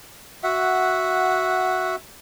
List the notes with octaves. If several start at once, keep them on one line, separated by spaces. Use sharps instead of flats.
F#4 E5 F#5